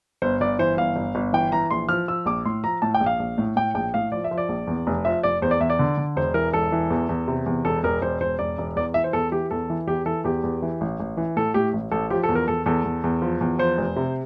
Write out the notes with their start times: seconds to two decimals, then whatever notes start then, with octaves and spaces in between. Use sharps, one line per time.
0.22 G1 C5
0.41 G1 D5
0.59 E3 C5
0.77 G1 F5
0.96 G1
1.15 G1
1.33 E3 G5
1.52 E3 A#5
1.71 A#1 C6
1.89 F3 F6
2.08 F3 E6
2.26 A#1 D6
2.45 A2 C6
2.64 F3 A#5
2.82 A2 A5
2.94 G5
3.00 A#1
3.06 F5
3.19 A#1
3.38 A2
3.56 A2 G5
3.75 A#1 G5
3.94 A2 F5
4.12 F3 D5
4.24 E5
4.31 F3
4.38 D5
4.49 A#1
4.67 E2
4.87 F1
5.05 F3 E5
5.23 F1 D5
5.42 E2 C5
5.51 D5
5.60 E2 E5
5.70 D5
5.79 D3
5.98 D3
6.16 E1 C5
6.34 E3 A#4
6.53 E1 A4
6.72 E3
6.90 E2
7.09 E2
7.28 C3
7.46 E2
7.64 E1 A4
7.84 E1 A#4
8.02 E1 C5
8.21 E1 C5
8.39 E1 D5
8.58 E1
8.76 E2 D5
8.94 E3 E5
9.04 C5
9.13 E2 A4
9.32 E3 G4
9.51 E2 A4
9.70 E3
9.87 E2 G4
10.06 E3 A4
10.24 E2 G4
10.44 E2
10.62 E3
10.81 A1
11.00 A1
11.17 E3
11.36 A2 A4
11.54 A2 G4
11.74 A1
11.92 A1 A4
12.10 F3 G4
12.23 A4
12.29 E2
12.35 A#4
12.48 E2 A4
12.66 E2 A4
12.84 E2
13.04 E2
13.22 F3
13.41 E2
13.59 F3 C5
13.78 F1
13.96 C3